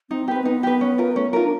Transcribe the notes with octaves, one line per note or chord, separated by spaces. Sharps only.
C4 D#4
B3 C4 G4 B4
B3 D#4
G4 B4
C#4
F4 A#4
A3 C#4
D#4 F4 A#4
D4